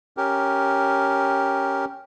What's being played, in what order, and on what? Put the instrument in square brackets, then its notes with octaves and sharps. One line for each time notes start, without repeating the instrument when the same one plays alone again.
[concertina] C#4 G4 A#4